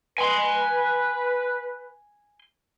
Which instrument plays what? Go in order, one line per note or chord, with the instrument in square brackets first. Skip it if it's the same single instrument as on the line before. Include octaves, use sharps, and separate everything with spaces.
[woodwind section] B4 [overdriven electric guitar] G#5 C6